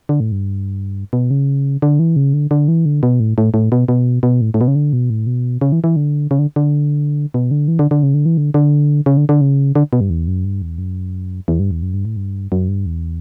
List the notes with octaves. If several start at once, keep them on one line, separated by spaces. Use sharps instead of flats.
D3
A2
G2
B2
C#3
D3
E3
C#3
D3
D3
E3
D3
B2
A2
A2
A2
B2
B2
B2
A2
A2
B2
C#3
D3
B2
A2
B2
C#3
E3
E3
D3
C#3
D3
D3
B2
D3
E3
D3
D3
C#3
D3
E3
D3
D3
C#3
D3
D3
C#3
D3
B2
G2
E2
F#2
G2
E2
F#2
E2
G2
E2
F#2
G2
A2
G2
F#2
G2
E2